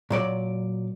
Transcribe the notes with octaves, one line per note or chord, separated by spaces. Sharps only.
A#2 F#3 D5